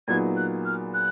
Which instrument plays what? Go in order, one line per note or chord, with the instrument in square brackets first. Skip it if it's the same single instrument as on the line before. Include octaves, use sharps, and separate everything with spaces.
[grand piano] A#2 F#3 B3 D#4 G#4 [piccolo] G#6
[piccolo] F#6
F6
F#6